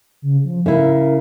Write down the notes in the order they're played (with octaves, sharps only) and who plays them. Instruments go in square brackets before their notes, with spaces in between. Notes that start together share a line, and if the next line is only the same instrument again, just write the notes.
[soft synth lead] C#3
F3
[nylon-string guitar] C#3 E4 [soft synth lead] A#4